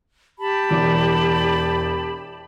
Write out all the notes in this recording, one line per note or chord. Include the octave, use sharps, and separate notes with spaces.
G4 A5 B5
E1 E2 D6